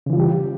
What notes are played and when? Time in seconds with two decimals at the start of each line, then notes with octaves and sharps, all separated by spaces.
0.06 C#3
0.10 E3
0.13 F4
0.16 G3
0.20 G4